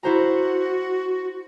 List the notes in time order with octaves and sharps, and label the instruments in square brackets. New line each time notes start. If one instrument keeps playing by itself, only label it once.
[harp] E4 C5 A#5 [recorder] F#4